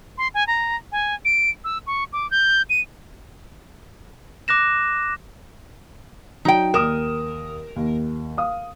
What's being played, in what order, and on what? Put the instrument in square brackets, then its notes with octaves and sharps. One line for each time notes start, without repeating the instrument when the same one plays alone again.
[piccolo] C6
G#5
A#5
G#5
D7
E6
C#6
D6
G6
D#7
[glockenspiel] D6 F#6 A#6 E7
[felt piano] F#3 [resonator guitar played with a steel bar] D#4 G5
[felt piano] D#2 D#6 E7 [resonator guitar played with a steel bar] A#4
[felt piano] D#2
F5 D#6